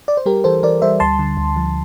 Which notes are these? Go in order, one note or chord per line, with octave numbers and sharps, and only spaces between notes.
D5
C5
G3 G4 A#4
E3 A4 C5
E3 A#4 D5
G3 C5 E5
D2 A5 C6
D3
D2
F3